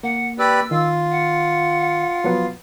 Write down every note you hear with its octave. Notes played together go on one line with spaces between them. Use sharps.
A#3 F#5
G4 B4 D5 E6
D#3 F4
F#5
F3 F#3 B3